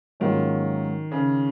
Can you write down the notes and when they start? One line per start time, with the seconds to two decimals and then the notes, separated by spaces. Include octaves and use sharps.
0.20 G#2 D#3 F#3 A#3 C#4 F4
1.12 C#3